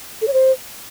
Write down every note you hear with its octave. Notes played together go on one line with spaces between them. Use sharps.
A4
C#5
C5